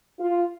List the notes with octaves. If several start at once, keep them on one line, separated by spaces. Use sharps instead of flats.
F4